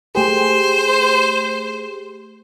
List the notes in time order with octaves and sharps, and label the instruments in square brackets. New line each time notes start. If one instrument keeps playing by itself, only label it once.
[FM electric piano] A3 G4 G#4 [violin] C5